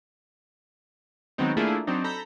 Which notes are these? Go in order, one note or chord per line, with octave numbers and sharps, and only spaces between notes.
D#3 F#3 G#3 B3 C4 D#4
A3 A#3 D4 E4 F4 G#4
F#3 C4 D4 D#4
A4 A#5 B5 G6